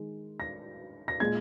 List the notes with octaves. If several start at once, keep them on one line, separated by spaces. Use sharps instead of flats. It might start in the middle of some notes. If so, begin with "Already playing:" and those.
Already playing: D#3 G#3
A#6
A#6
A#2 G#3 G#6